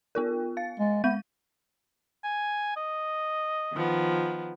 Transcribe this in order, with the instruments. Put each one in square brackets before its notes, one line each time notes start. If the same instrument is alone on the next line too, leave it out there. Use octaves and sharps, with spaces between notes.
[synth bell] B3 F4 A#4
F5 A6
[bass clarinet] G#3
[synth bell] G#3 G6 D#7 [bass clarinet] B3
[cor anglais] G#5
D#5
[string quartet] D#3 F3 B3